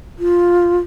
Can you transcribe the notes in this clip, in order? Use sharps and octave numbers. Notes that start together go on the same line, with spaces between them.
F4